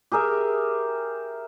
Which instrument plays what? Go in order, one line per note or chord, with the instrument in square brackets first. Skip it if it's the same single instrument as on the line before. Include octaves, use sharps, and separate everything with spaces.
[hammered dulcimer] G4 G#4 A#4 E5